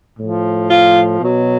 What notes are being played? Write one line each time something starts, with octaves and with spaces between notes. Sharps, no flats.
A2 F3
F4
B2 F#3